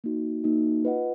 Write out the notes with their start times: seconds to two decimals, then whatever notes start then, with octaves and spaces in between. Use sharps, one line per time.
0.04 A#3 D#4 F#4
0.44 A#3 D#4 F#4
0.85 F4 B4 D#5 F#5